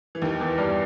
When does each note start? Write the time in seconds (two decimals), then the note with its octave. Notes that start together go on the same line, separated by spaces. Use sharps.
0.15 E3
0.22 D#2 D#3
0.40 E2 E3
0.58 G2 G3